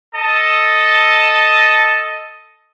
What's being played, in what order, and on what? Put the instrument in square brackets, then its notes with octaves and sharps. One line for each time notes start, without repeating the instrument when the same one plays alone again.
[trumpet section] A4 D#5 A5